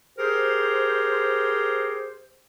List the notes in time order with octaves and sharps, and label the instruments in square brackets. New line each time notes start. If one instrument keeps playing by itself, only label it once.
[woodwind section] G4 G#4 A#4 C5